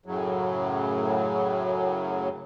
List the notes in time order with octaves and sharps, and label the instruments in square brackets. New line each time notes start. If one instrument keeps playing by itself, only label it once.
[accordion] F#2 A2 C#3 F#3